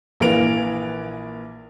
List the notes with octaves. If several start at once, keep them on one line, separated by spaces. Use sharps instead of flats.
A#1 E3 A#3 B4 D7 F7